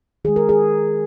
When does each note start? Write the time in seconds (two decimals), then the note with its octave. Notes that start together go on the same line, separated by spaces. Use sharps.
0.25 D#3 G#4
0.28 G#3
0.36 A#4
0.49 G#4